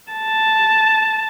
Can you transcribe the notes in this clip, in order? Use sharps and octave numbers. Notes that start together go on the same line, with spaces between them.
A5